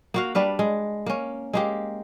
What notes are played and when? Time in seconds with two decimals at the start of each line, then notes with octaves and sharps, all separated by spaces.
0.14 A#3 F#4 F5
0.35 G3 D4 B4 F5
0.59 G#3
1.06 A#3 C#4
1.53 G#3 A#3 G4